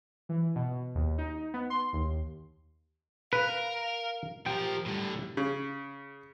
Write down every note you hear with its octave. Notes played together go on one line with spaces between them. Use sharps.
E3
B2
D#2
D#4
B3
C6
D#2
A#4 B4 F5
F3 G4 A#4 G5
A2 D3 G3
C#3